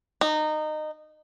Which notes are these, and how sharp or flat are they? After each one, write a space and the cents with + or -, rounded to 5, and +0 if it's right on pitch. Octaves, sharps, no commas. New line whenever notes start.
D#4 -20